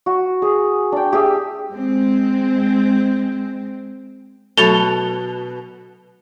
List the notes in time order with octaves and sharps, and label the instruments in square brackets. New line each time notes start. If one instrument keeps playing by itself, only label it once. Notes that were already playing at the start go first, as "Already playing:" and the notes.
[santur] F#4
G#4
D4 G5
G4 G#4 E5
[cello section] G#3 C4
[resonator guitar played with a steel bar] B2 [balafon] F#3 A3 F#4 [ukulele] A4 [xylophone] A6 F7 G7